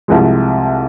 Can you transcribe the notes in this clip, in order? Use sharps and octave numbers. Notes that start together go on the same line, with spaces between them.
C2 C3 F3 G#3